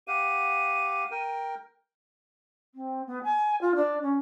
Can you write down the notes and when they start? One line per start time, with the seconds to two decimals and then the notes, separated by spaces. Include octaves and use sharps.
0.08 G4 F5 F#5 D#7
1.11 A#4 G5
2.75 C4
3.07 B3
3.24 G#5
3.61 F4
3.76 D4
4.03 C#4